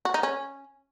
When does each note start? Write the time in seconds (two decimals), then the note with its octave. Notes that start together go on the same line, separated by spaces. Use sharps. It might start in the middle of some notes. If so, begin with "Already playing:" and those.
0.05 F#4
0.14 D#4
0.23 C#4